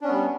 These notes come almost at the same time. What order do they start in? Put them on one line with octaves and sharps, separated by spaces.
D4 C#4 B3 G3